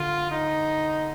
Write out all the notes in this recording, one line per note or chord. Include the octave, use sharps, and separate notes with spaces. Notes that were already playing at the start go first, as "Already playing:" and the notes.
Already playing: D3 F4
D#4